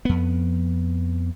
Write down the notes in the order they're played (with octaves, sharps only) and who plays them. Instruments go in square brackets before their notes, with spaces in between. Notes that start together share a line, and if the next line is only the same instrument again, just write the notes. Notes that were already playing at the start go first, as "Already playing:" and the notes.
[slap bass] F2 B3